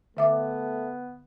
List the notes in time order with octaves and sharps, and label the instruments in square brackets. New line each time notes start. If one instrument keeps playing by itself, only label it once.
[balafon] D3 E5 D6 [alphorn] A3 [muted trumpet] B3